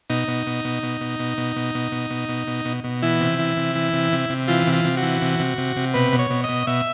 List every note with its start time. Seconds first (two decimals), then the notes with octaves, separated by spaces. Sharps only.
0.10 B2 D#4
0.28 B2
0.47 B2
0.65 B2
0.83 B2
1.01 B2
1.20 B2
1.38 B2
1.56 B2
1.75 B2
1.92 B2
2.10 B2
2.29 B2
2.47 B2
2.65 B2
2.84 B2
3.02 E3 E4
3.21 C3
3.39 E3
3.57 C3
3.75 E3
3.93 C3
4.12 C3
4.30 C3
4.48 E3 F4
4.67 C3
4.73 F4
4.85 C3
4.97 F#4
5.03 E3
5.22 C3
5.39 C3
5.58 C3
5.76 C3
5.94 B2 B4
6.13 B2
6.19 C#5
6.30 B2
6.44 D#5
6.49 B2
6.67 B2 E5